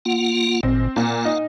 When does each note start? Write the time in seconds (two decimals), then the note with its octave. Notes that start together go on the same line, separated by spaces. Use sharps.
0.05 A#3 F4 F#5
0.63 G#1 A#2 C4
0.96 A#2 F5 F#5
1.25 D#4